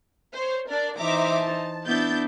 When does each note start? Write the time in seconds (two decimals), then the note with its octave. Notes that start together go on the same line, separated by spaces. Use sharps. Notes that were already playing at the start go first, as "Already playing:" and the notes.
0.33 C5 C#5
0.67 D4 A#4 D5
0.98 E3 D#4 C5 E5 A#5 D6
1.40 A5
1.86 B3 D4 E4 G6 A6